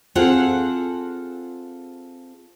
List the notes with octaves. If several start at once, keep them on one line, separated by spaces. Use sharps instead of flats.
C4 F4 G#4 A4 F#5